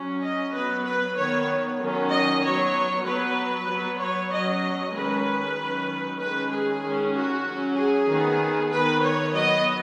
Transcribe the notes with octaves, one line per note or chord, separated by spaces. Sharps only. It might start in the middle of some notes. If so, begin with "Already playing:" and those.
Already playing: F#3 C#4
D#5
F#3 B3 B4
B4
D#3 B3 C#5
D#3 F#3 C#4
D#5
F#3 B3 C#5
F#3 B3 B4
F#3 B3
C#5
F#3 C#4 D#5
D#3 G#3 C#4 B4
D#3 F#3 C#4
D#3 G#3 C#4 B4
G#4
D#3 G#3 C#4
F#4
F#3 C#4
G#4
D#3 B3
D#3 B3 B4
C#5
F#3 B3 D#5